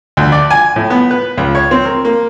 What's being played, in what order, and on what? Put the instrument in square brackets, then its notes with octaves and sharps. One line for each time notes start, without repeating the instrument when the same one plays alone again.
[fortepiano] D2
D5
G#5
A2
B3
B4
C#2
C#5
C4
A#4
A#3